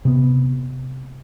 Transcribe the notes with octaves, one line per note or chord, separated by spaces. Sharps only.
C3 B3